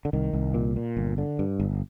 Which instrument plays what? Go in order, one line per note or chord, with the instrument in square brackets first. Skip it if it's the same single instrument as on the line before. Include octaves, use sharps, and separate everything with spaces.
[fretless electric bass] D3
C2 D#3
C2
A#2
A#2
G1
D3
G2
G1